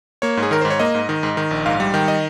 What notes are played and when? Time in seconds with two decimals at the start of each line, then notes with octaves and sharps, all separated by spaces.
0.22 A#3 C#5
0.37 G#2
0.43 G#4
0.51 D#3 A#4
0.61 G#2 C5
0.70 C#5
0.79 A#3 D#5
0.95 G#2
1.09 D#3
1.23 G#2
1.37 D#3
1.51 A#1
1.66 G#2 F5
1.80 G3
1.94 D#3 G5
2.08 D#5